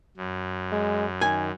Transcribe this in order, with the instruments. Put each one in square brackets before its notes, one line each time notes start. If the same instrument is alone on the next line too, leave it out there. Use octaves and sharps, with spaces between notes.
[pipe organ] F#2
[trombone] G#3
[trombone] D#3 [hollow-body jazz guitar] G#5